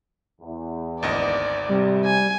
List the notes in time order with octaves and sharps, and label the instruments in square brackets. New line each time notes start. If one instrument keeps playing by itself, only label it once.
[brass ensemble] E2
[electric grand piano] G#1 D2 D#5 [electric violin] D5
[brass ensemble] C3 [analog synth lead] G3
[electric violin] G#5